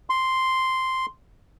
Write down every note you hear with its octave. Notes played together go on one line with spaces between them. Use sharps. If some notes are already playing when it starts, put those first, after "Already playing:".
C6